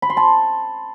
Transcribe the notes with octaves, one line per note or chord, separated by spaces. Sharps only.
B5
C6
A5